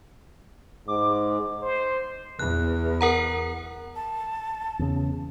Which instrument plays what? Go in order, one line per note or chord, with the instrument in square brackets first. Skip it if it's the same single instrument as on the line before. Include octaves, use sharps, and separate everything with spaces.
[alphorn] G#2 [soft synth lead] D6
[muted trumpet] C5
[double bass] E2 [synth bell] F#6
[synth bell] A#4 F#5 A#5
[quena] A5
[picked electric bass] E2 C#3